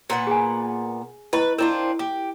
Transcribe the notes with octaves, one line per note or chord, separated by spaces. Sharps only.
A#2 B3 F#5
G#4 G#5
E4 B4 D#5 C#6
C4 D4 E4 F4 A#4
G4 D6